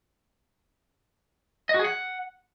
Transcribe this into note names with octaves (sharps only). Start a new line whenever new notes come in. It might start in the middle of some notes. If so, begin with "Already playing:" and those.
D#5
F#4
G#4
F#5